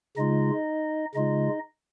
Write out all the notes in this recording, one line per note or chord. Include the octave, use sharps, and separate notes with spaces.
C#3 G#3 D#4 F4 D#5
C#3 G#3 D#4 F4 D#5